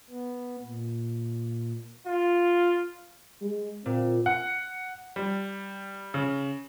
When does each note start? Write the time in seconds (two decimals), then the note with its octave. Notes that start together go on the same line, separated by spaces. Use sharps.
0.10 B3
0.62 A#2
2.07 F4
3.42 G#3
3.86 A#2 C4
4.26 F#5
5.16 G3
6.14 C#3